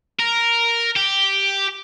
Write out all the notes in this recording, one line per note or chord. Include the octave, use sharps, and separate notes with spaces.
A#4
G4